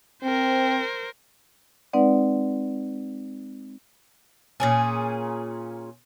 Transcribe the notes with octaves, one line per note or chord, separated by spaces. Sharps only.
C4 A#4 C5
G#3 C4 D#4 B4 D5 F#5
A#2 C#4 G#4